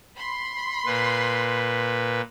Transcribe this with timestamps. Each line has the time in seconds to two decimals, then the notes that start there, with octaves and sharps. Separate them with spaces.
0.17 B5 C6
0.86 A#2 B4